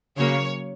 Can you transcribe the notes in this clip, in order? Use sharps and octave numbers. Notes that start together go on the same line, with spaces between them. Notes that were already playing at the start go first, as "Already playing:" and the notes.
C#3 F#3 A#3 C#5